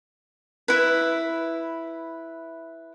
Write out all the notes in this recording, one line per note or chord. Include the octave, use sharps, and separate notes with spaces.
E4 B4